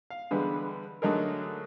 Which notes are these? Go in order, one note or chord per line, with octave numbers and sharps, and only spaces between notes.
F5
D3 E3 G3 G#3 B3
D3 F#3 A3 D#4 G#4 A#4